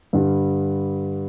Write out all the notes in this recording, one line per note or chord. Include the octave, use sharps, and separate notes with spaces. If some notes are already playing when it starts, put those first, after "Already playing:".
G2 D3 G3